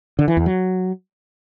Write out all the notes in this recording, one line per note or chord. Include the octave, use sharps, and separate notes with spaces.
D3
E3
E2
F#3